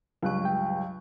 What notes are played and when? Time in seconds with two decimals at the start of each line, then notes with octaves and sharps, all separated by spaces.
0.22 C#2 G2 F#3 C#6 F#6
0.45 G5